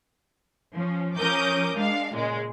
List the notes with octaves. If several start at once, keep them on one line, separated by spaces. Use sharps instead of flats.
F3 C#4
F3 C#4 A#4 D6 D#6 G6
G#3 D4 F5
A#2 C#3 G#3